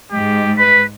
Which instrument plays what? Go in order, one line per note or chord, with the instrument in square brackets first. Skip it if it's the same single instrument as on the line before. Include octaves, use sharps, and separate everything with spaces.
[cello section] G#2 G#3 [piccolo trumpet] G4
[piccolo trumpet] B4 [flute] B6